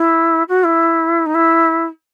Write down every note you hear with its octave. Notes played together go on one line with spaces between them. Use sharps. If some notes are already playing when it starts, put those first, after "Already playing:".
Already playing: E4
F#4
E4
D#4
E4